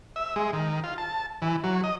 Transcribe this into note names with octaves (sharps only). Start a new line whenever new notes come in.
E5
G#3
D#3
F4
A5
E3
F#3
D#5